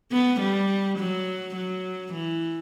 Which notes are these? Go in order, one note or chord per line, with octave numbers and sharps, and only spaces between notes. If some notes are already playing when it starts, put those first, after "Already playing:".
B3
G3
F#3
F#3
E3